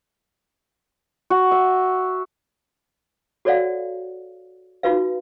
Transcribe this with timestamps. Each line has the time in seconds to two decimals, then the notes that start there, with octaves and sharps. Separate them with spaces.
1.30 F#4
1.51 E5
3.45 F#4 A4 C#5 D5 F5 F#5
4.83 D#4 F4 F#4 B4 F5